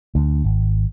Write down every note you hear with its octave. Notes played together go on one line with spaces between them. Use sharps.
D2
G#1